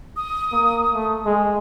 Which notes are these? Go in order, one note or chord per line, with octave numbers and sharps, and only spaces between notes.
D#6
A#3
A3
G#3